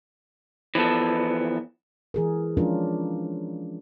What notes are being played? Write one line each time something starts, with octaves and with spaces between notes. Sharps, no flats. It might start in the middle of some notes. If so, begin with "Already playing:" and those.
E3 F3 B3 A4
E3 G#4 A#4
F3 G#3 C#4 D4 F4 A#4